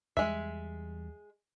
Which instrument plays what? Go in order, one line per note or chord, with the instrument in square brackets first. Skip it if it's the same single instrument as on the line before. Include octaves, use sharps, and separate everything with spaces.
[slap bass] E2 G3 [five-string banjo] G#3 E5